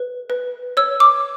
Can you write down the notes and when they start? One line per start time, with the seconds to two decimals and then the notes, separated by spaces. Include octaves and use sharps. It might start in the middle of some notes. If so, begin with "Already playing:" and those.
Already playing: B4
0.30 B4
0.77 C#5 E6
1.00 D6